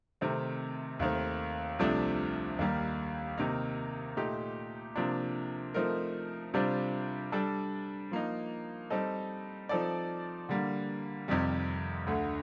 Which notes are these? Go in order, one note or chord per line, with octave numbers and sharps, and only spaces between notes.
C3 D#3 A3 C4
D#2 D#3 A3 C4
C2 C3 F3 A3 D4
D#2 D#3 G3 A#3 D#4
C3 D#3 A#3 D#4
A#2 A3 D#4 G4
C3 F3 A#3 D4
F3 A3 C4 D#4 A#4
C3 G3 D4 F4 C5
G3 D4 A4
F3 A#3 D#4
G3 C4 D#4 A4 D#5
F3 C4 D#4 A4 D5
D3 G3 A#3
F2 C3 D#3 G3
D2 D3 A3